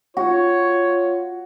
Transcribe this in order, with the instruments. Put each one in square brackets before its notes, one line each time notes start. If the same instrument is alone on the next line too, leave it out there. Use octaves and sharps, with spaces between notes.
[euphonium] F4 [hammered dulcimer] F#4 [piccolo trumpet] C#5